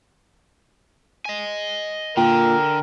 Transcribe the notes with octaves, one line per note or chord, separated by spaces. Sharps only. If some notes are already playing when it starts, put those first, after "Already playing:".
D#5 G#5
A#2 D3 A#4 G5